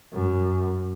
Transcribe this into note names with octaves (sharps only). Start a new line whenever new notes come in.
F#2